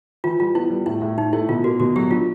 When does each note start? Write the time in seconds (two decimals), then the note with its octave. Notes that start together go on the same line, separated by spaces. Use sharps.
0.24 E3 F4
0.39 G3 F4
0.55 B3 E4
0.70 G3
0.86 A2 E4
1.02 A2
1.17 A2 D#4
1.33 A3 E4
1.48 B2 F4
1.64 A#3 F#4
1.80 B2 F#4
1.96 F#3 G4
2.11 D4 F4